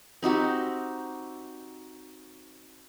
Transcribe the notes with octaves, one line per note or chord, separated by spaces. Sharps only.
C4 D#4 F#4 G4